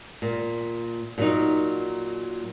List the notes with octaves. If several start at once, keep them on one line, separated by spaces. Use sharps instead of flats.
A#2
A#2 F#3 D#4